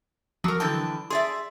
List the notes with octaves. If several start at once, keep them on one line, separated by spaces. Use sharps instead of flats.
F3 F#3 F#4 A#4
D3 E3 G5 A5
G#4 D5 E5 C6